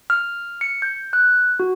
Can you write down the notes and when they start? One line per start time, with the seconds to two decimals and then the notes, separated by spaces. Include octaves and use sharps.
0.10 F6
0.61 C#7
0.82 G6
1.13 F#6
1.60 F#4